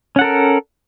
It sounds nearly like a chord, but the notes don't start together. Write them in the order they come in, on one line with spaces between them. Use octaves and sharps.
C#4 F#5 A4 A#4